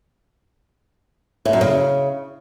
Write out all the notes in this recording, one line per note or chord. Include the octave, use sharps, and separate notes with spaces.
A2
F#2
C#3